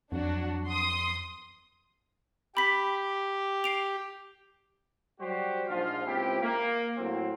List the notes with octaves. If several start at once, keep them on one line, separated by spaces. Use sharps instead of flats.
F2 F#3 D4 F#4
C6 D#6
G4 G5 B5 B6
C7 D7 F7
F#3 G3 F#4 G4 C5
A#1 G#2 F3 F4 F5
C#2 C4 E4 G4
A#3
A2 F#3 C4